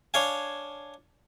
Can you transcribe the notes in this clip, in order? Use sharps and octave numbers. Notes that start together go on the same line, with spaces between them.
D4 C#5 F5 G#5